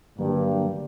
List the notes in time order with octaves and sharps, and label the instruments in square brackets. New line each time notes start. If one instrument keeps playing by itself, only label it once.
[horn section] G2 [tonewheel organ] D3 F#3 A#3